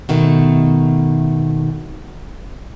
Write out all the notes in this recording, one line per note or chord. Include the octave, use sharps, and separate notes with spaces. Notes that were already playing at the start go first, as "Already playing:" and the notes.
B2 D#3 A3